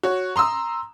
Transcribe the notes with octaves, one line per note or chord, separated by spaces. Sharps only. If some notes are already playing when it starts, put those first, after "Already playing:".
F#4 C#5
A#5 C6 D#6 E6